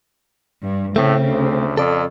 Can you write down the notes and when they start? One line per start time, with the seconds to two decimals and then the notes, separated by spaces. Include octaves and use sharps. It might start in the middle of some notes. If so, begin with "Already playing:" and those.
0.64 G2
0.96 A2 C#3 A3 C4
1.28 D2
1.77 F2 A4 D5